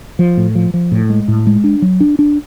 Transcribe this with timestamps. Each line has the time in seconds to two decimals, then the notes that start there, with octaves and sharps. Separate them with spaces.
0.19 F3
0.37 A2
0.55 F3
0.74 F3
0.92 A2
1.10 G#3
1.28 A2
1.47 G#3
1.64 D4
1.82 F#3
2.00 D4
2.19 D4